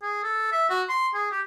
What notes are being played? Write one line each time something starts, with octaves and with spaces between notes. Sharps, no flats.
G#4
A4
E5
F#4
C6
G#4
G4